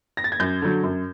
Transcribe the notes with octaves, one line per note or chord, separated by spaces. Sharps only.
A#6
A6
G#6
F#2 G6
D3 F#3
F#2